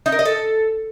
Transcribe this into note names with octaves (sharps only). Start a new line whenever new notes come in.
D#4
A#4
D#5
A4